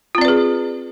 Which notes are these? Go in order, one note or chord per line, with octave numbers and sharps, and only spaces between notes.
C4 F4 G#4 B4 D5